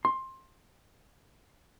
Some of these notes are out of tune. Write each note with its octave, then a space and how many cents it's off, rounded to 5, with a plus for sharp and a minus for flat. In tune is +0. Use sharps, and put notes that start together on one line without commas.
C6 +20